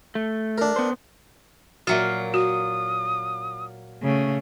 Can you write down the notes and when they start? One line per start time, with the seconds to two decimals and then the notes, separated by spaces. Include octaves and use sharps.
0.15 A3
0.58 D4 A#4
0.76 B3 C5
1.87 A#2 F#3 F4 F#4 E5
2.34 F#4 D#6
4.02 C#3 A3